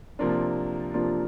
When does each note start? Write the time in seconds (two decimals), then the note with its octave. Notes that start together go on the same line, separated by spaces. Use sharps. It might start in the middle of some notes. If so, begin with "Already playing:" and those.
0.19 C3 F3 A#3 D4 F4
0.94 C3 F3 A#3 D4 F4